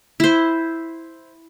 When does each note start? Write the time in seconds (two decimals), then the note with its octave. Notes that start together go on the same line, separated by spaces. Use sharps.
0.20 E4 C5